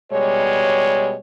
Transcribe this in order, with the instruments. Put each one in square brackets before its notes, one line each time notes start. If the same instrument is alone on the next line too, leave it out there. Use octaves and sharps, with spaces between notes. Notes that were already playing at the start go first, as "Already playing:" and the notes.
[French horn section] B2 G3 G#3 C#5